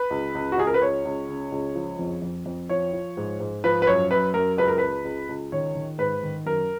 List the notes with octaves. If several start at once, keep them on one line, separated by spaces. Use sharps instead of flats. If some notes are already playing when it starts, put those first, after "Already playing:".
Already playing: B4
C#2
C#2
F#4
C#2 G#4
A#4
B4
C#2 C#5
C#2
C#3
C#2
F3
F2
F2
F2
F3 C#5
F3
G#2
G#2
F3 B4
B4
F#2 C#5
F#2 B4
F#2 A#4
C#2 B4
A#4
C#2 B4
C#2
C#2
D#3 C#5
D#3
G#2 B4
D#3
F#2 A#4